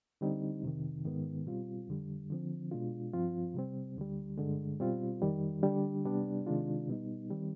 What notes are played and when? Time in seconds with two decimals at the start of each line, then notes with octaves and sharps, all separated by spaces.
0.21 D3 G3 C4 D#4
0.63 F2 C3 D#3
1.05 G#2 D#3 G#3 B3
1.46 B2 G3 C4 F4
1.88 F2 D3 G3
2.30 D3 F3 C4
2.71 B2 G#3 D4 F4
3.13 G2 F3 C4 F4
3.54 C3 G3 C4
3.96 D2 D3 G3
4.38 G2 D3 G#3
4.80 B2 G3 C4 F4
5.21 F2 D#3 G3
5.63 D3 G3 D4
6.05 C3 G3 B3 D4
6.47 C3 D#3 G#3 D4 F4
6.88 B2 G3 B3 D#4
7.30 D#3 G3 C4